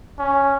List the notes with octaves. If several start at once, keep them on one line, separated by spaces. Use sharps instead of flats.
C#4